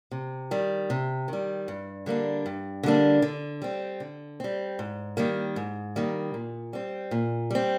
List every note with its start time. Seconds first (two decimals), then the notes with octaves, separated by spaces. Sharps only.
0.11 C3
0.51 D#3 G3
0.90 C3
1.28 D#3 G3
1.68 G2
2.06 D3 G3 A#3 D4
2.46 G2
2.83 D3 G3 A#3 D4
3.22 D3
3.62 G3 C4
4.00 D3
4.40 G3 C4
4.79 G#2
5.17 D#3 G3 A#3
5.56 G#2
5.96 D#3 G3 A#3
6.34 A#2
6.73 G3 C4
7.11 A#2
7.51 G3 C4